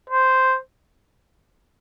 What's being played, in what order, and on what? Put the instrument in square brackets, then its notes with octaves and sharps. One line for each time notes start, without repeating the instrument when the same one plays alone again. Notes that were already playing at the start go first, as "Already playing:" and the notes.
[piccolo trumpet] C5